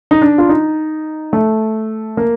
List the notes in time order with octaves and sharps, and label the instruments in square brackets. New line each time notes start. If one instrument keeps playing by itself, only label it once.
[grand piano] D#4
D4
F4
D#4
A3
A#3